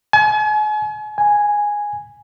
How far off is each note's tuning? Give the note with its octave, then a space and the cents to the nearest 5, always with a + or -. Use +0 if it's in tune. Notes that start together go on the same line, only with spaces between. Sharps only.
G#5 +40
G#5 -5